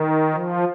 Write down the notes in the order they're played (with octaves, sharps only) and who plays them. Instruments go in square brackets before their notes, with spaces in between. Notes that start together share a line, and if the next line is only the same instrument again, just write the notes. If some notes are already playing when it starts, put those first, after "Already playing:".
Already playing: [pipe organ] D#3
F3